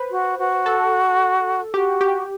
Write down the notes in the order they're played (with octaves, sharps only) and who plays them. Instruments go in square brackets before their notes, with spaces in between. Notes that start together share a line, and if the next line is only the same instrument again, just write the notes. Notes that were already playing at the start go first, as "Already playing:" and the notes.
Already playing: [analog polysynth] B4 C5
[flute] F#4
F#4
[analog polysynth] A4
[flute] F#4 [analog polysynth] G4
[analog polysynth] G4